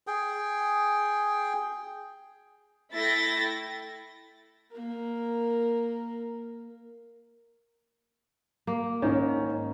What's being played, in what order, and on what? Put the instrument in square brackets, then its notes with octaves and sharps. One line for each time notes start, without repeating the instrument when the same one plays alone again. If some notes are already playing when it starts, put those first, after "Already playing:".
[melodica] G#4 G5
[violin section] A3 E4 G5 A6 A#6
[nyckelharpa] A#3 A#4
[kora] A#3
[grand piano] G#2 C#4 [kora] D#3